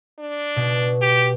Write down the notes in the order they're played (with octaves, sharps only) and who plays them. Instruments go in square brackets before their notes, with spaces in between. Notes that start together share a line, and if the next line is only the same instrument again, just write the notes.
[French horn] D4
[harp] B2
[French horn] G4